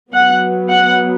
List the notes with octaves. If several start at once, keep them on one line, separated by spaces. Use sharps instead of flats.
F#3 B3 F#5
F#5